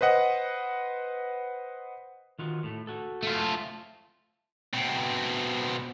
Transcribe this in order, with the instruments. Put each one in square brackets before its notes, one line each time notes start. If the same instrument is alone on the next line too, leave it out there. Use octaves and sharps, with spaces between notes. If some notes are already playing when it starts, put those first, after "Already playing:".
[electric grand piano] B4 C5 D#5 F#5
[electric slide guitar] D#3 F4 F#4
A2 A3
F#4 A4
[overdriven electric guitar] A3 F4
[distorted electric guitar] B2 C4